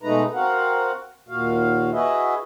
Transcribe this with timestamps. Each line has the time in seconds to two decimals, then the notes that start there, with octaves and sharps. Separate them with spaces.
0.03 B2 G#3 A3 D#4 B4 A#5
0.34 C4 F#4 A#4 F5 F#5
1.29 D#2 A#2 F#4 F5
1.92 E4 F#4 G#4 B4 D#5 E5